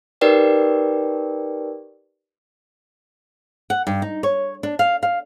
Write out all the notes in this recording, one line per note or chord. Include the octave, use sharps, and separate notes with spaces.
D#4 G4 A#4 B4 D5 G5
F#5
G2
D#4
C#5
D4
F5
F5